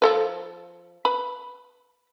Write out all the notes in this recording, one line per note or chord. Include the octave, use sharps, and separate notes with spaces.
F3 A4 B4
B4 B5